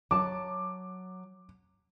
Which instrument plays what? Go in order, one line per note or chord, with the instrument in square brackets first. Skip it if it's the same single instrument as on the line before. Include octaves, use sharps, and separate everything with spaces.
[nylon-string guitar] F#3 A5 [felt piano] D6